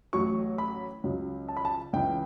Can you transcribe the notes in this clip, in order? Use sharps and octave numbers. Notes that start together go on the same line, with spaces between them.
A1 A2 F#3 C#6
B5
C#2 C#3 F#3
A5
B5
A5
C#2 C#3 E3 G5